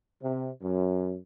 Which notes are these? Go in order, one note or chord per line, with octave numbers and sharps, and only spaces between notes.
C3
F#2